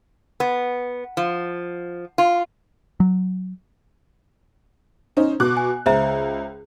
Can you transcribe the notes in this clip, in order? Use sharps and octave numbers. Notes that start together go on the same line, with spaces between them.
B3
F3
F4
F#3
C#4 D#4 C5
B2 D6 F#6
G#5
C#2 C5 E5 A#5